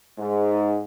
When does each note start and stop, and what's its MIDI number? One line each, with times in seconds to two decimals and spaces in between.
0.19 0.83 44